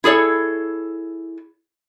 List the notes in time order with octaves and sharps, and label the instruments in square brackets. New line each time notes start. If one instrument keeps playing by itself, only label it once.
[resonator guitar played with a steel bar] E4 G#4 A4 C#5